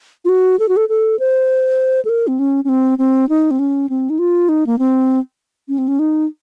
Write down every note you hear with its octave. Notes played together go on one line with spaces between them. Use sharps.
F4
F#4
A4
F#4
A4
A4
C5
A4
A#4
C4
C#4
C#4
C4
C4
D#4
C4
C#4
C4
D#4
F4
D#4
A#3
C4
C#4
C4
C#4
D#4